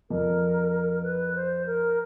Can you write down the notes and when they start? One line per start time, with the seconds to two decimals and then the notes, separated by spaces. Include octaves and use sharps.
0.10 F2 A#4
1.03 B4
1.35 C5
1.66 A#4